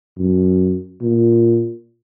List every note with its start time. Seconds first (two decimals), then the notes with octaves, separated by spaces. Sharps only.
0.18 F#2
1.02 A#2